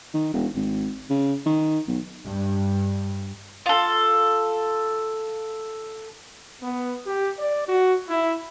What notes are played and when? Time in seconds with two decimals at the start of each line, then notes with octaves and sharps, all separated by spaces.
0.14 D#3
0.33 E1
0.55 G#1
1.10 C#3
1.46 D#3
1.88 B1
2.26 G2
3.66 F4 A4
6.61 B3
7.07 G4
7.38 D5
7.67 F#4
8.09 E4